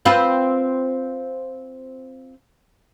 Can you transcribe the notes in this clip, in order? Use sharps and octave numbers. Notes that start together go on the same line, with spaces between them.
C4 F4 B4